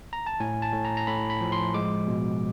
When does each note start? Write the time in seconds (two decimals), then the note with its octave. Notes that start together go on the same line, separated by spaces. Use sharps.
0.13 A#5
0.27 A5
0.40 A2 G#5
0.62 A5
0.73 A2
0.85 A#5
0.97 A#5
1.07 A2 B5
1.30 B5
1.41 F3
1.52 C6
1.74 G#3 D6
2.08 B2